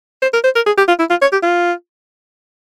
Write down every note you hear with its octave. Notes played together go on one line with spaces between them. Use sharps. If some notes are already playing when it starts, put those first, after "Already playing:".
C5
A#4
C5
A#4
G#4
G4
F4
E4
F4
C#5
G4
F4